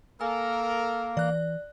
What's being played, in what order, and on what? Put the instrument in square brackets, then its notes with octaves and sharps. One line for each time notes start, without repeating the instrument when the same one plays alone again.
[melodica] A#3 [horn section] A4 A#4 [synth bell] G#5
[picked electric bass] E3 [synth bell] D5 F#6